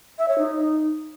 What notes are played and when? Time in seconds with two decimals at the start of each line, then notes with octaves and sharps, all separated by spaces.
0.18 E5
0.28 C#5
0.38 D#4